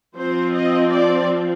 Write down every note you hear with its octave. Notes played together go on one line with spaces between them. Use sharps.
F3 C4 C5
D#5
D5